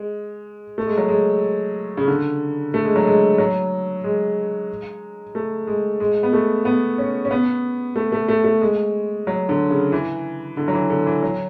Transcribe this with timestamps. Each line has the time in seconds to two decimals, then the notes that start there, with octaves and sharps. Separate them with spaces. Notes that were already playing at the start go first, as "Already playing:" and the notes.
Already playing: G#3
0.78 A3
0.87 G#3
0.98 F#3
1.08 G#3
1.97 C#3
2.08 D3
2.74 A3
2.85 G#3
2.96 F#3
3.07 G#3
3.38 F#3
4.04 G#3
5.35 A3
5.67 G#3
6.00 G#3
6.23 B3
6.33 A3
6.65 B3
6.98 C#4
7.25 C#4
7.31 B3
7.96 A3
8.12 A3
8.29 A3
8.44 A3
8.61 G#3
9.27 F#3
9.49 D3
9.70 C#3
9.92 E3
10.57 D3
10.68 F#3
10.73 E3
10.90 D3
11.06 E3
11.22 F#3